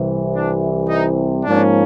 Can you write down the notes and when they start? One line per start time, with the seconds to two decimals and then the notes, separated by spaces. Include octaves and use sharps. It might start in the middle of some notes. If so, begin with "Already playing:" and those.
Already playing: C2 C3 E3
0.34 D4
0.89 D#4
1.45 G#2 F3 A#3 C#4 D4